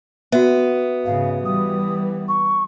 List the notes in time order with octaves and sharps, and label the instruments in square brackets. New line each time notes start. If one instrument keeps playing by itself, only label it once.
[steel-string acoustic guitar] B3 [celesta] F#4 E5
[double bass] G#2 C#3 [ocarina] F5
[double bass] E3 G3 [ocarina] D#6
[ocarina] C#6